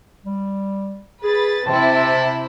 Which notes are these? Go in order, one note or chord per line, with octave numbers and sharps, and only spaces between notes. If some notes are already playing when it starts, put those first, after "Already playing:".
G3
G#4 B4 A6
C3 C4 E4 A5